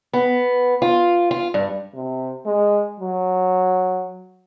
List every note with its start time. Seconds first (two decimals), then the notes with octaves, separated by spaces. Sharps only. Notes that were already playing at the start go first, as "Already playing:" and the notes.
0.13 B3
0.82 F4
1.31 F4
1.54 G2
1.94 C3
2.46 G#3
3.00 F#3